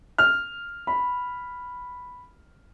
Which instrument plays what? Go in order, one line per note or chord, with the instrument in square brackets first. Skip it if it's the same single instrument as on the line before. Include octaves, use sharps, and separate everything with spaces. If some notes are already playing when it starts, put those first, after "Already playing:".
[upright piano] F6
B5